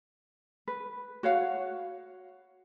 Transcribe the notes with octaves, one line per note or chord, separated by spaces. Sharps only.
B4
F#4 C#5 F5 F#5